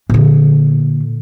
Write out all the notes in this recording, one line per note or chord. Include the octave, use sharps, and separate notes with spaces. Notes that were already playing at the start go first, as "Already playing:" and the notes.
A#2 D3